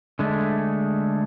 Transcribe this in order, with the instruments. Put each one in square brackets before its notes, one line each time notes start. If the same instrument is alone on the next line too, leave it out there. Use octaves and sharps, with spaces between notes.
[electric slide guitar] D3 G#3 A3